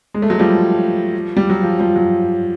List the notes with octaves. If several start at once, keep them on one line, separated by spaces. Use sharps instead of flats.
G#3
A3
F#3 G#3
F3 G3
G3
F#3
F3
F3 G3
F#3